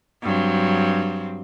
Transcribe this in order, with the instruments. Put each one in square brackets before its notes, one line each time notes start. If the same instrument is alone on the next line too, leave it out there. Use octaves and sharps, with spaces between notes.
[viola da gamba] G2 F#3 C4